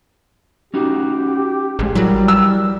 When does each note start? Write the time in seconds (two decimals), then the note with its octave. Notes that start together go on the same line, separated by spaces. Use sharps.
0.74 C#4 D#4 F#4 G4
1.79 A1 G#3 G#4
1.95 F#3 G3 E4 A#4
2.28 E6